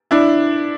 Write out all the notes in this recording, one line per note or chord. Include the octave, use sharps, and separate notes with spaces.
D4 E4